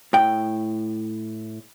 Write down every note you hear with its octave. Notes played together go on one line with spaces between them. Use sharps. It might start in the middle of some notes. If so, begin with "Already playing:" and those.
A2 G5